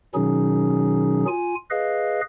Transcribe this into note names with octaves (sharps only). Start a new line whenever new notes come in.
B2 D#3 F#3 C#4 D#4 G#4
F4 G#5
G#4 B4 D#5 F5